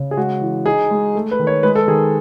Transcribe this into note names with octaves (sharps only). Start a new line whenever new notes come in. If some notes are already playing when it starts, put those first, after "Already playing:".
Already playing: C#3
G#4
G#3 F#4
E3
D#4 G#4
G#3
A3
B4
D#3
C#5
G#3 B4
A4
D#3 G#4